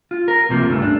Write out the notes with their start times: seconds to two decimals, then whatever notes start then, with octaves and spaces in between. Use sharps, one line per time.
0.11 F4
0.28 A#4
0.49 C#2 C3 F3 A#3
0.69 C#2 G2 C#3 A3
0.82 D4